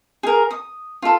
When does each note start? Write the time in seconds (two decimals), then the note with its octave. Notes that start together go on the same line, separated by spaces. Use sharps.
0.23 G#4 A#4
0.51 D#6
1.02 F4 A4